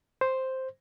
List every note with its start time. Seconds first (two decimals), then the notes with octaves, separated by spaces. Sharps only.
0.21 C5